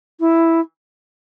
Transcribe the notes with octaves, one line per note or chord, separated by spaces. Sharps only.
E4